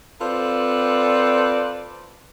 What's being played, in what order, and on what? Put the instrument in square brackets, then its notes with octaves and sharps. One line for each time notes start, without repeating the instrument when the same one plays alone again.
[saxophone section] C4 F4 A4 B4 C5 D5